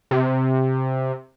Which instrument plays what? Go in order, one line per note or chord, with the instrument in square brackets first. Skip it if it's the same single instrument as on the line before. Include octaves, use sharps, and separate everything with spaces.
[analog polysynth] C3